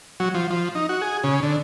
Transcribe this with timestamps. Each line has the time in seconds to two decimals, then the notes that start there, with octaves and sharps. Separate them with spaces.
0.20 F#3
0.34 F3
0.50 F3
0.75 D#4
0.89 F#4
1.02 G#4
1.24 C#3
1.43 D3